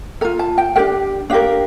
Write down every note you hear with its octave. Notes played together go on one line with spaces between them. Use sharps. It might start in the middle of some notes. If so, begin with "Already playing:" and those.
F4 A4 A#5
A5
G5
D4 G4 A#4 G5
D4 G4 A#4 F5